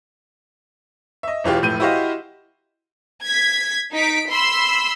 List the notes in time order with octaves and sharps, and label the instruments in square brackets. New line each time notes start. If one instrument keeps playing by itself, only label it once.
[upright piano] D#5 E5
E1 E3 F4 G4
F1 A2 G6 D#7
E4 F#4 G4 C5 D#5 F5
[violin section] G#6 B6
D#4 B6 D7
B5 C6 E6